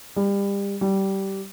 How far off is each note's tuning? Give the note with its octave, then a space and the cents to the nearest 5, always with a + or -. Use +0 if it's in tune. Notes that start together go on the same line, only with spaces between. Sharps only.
G3 +30
G3 -15